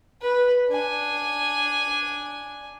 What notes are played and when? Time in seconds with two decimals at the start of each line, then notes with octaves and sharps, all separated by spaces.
0.21 B4
0.69 D4 G#5